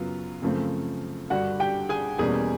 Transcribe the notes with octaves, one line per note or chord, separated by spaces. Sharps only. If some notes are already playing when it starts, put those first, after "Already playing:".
Already playing: F#2 C#3 F#3 B3 F4
F#2 C#3 F3 A3 C4
G2 D3 G3 F#4 F#5
G4 G5
G#4 G#5
E2 B2 G3 A#3 C#4 G#4 G#5